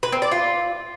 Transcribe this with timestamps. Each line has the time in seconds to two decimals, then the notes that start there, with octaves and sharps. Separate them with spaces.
0.03 B4
0.12 C4
0.22 D5
0.31 F4